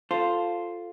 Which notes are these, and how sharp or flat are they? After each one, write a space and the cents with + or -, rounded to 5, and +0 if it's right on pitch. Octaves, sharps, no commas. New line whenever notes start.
F4 +0 A4 +0 C5 +0